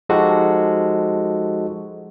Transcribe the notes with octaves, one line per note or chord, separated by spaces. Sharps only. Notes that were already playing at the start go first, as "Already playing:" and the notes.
F3 G#3 D#4 F#4 G4 A4